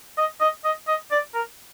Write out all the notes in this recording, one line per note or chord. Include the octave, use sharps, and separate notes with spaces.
D#5
D#5
D#5
D#5
D5
A#4